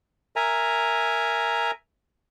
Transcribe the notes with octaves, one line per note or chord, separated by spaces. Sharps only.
A#4 E5 G#5 A#5